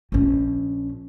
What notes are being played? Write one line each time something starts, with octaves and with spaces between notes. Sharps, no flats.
A#1 C#4